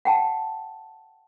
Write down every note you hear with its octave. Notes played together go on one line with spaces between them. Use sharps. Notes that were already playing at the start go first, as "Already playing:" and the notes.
F#5 G5 A5